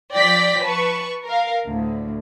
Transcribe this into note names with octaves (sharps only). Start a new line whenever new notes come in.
F3 D5 G5 A#6 B6
B4 A5 C#6
A#4 F5
D2 A2